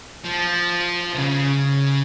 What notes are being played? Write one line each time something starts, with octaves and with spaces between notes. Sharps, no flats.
F3
C3
C#3